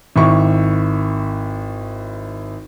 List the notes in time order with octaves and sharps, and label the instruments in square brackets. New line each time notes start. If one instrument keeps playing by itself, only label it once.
[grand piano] G#1 E4 C#6